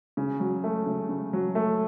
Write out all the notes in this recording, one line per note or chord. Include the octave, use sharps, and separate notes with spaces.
C#3
F#3
A3
C#3
C#3
F#3
A3